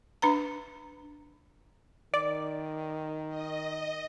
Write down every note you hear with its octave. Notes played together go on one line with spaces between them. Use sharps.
D4 B4 A#5
D#3 D5
D#5